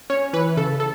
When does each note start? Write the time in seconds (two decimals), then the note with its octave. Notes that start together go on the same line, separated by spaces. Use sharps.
0.10 C#4 C#5
0.33 E3 B4
0.57 C#3 A4
0.80 A4